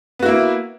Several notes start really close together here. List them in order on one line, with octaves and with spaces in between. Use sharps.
B3 F#4 E4 A#3